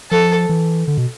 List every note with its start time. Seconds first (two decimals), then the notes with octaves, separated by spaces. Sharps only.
0.11 F3 A4
0.49 E3
0.88 D3
0.98 B2